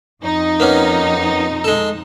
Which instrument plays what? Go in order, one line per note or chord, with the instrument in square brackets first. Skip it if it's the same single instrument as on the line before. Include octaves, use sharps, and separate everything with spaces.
[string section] F2 D#4
[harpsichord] A#3 B3 C#4
G#3 A4